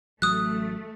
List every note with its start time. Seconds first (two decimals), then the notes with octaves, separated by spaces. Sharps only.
0.22 A1 F#3 A3 D#6 F#6